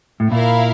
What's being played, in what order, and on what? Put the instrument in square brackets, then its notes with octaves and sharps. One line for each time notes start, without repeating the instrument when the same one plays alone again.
[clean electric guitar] A2
[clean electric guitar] A#2 [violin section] E4 A#4 F5